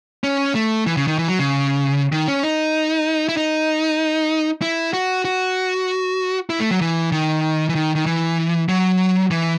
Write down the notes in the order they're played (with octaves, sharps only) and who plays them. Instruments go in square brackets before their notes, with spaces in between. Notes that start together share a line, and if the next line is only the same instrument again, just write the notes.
[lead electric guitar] C#4
A3
E3
C#3
D#3
E3
F#3
C#3
D#3
C#4
D#4
E4
D#4
E4
F#4
F#4
E4
A3
F#3
E3
D#3
E3
D#3
D#3
E3
F#3
E3